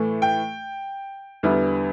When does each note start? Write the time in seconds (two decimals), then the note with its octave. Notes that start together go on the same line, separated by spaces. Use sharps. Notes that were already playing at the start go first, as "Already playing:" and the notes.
Already playing: A2 E3 A3
0.22 G5
1.43 E2 D3 G3 B3 E4